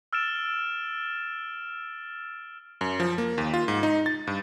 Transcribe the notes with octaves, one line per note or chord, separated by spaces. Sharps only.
E6 F6 A6 D7 E7
F#2
F3
A#3
D#2
F4
G#2
D#4
A6
G2